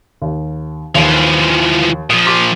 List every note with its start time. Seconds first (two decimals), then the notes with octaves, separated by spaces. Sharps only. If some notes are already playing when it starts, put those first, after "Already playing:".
0.21 D#2
0.95 D#2 E3 F3
2.10 A#2 F3 D#6
2.26 C6 D6 B6